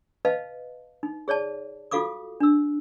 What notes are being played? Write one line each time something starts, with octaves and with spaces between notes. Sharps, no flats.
B4 D#5 F5 A5
D#4
G#4 C#5 D5 A5
F4 F#4 A4 F5 D6 D#6
D4 E6